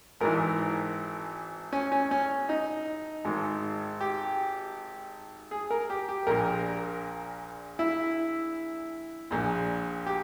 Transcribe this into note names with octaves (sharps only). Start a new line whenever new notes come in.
G#1 G#2 E3 A#4
C#4
C#4
C#4
D#4
G#1 G#2 D#3
G4
G#4
A#4
G4
G4
A#1 A#2 A#4
E4
A#1 A#2
G4